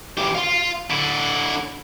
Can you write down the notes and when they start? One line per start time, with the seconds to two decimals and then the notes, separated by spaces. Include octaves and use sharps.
0.17 E3 G4
0.35 F5 C6
0.90 D3 E4